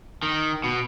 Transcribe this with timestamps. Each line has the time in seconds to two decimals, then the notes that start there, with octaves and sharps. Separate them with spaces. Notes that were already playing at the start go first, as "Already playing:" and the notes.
0.23 D#3
0.64 B2